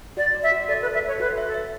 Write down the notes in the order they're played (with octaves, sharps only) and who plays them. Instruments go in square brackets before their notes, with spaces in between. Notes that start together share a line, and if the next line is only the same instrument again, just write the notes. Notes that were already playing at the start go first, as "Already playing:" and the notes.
[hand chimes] F#4 [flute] D5
[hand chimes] D5
[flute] E5
[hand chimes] F#4
[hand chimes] A4 [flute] D5
[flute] B4
[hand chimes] A4
[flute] E5
[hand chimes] A4 [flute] C#5
[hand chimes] F#4 [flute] B4
[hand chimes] E5
[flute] A4
[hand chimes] E5